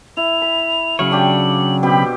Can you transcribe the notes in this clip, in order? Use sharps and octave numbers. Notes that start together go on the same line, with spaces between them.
E4 F7
B5
C#3 F#3 C#5 F5 F#7
D4 G4 D5
B2 C4 G4 B5